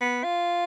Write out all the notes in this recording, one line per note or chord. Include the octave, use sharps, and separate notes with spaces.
B3
F4